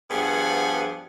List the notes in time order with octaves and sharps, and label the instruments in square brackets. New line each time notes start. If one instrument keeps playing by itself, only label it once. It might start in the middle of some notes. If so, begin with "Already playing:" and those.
[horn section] G2 F3 B3 G#4 F#5 G#5